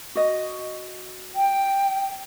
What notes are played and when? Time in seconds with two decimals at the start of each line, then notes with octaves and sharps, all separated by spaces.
0.15 F#4 D#5
1.35 G5